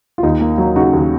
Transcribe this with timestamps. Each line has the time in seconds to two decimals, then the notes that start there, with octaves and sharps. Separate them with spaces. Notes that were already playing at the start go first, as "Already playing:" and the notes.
0.18 F4
0.23 D#2 D#4
0.41 A#3
0.58 F#3
0.76 C#3 D#4 F#4
0.93 D#2